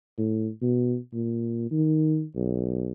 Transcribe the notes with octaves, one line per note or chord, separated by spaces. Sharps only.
A2
B2
A#2
D#3
B1